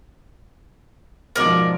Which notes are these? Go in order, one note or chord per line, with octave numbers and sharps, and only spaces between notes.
G#2 B2 F3 A#4 D5